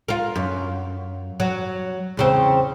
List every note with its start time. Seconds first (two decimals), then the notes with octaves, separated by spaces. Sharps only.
0.08 F4 A#4
0.36 F#2
1.40 F#3
2.17 E2 C#3 C4